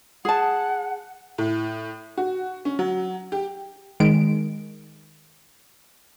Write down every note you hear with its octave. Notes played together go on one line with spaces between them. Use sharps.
G#4 F#5 A5
A2
F#4
C#4
F#3
G4
D#3 G#3 D7